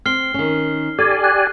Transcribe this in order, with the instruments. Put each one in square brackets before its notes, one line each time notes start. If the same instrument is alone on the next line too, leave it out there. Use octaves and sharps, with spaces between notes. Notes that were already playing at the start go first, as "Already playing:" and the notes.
[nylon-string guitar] C4 [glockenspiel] F6 C7 G7
[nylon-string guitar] D#3 C#4
[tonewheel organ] G4 D5 G#5 [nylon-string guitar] A4
[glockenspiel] F#6